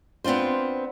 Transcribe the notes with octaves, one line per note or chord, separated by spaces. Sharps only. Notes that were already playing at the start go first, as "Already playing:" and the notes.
B3 C4 D4 F4 C5